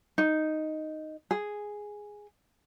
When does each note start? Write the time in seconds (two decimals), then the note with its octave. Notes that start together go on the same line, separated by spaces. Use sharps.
0.18 D#4
1.31 G#4